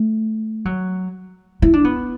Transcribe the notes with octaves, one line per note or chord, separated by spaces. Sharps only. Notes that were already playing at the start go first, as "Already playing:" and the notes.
Already playing: A3
F#3
E4
D4
B3